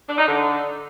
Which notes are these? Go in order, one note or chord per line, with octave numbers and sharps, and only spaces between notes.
D4
D#4
D3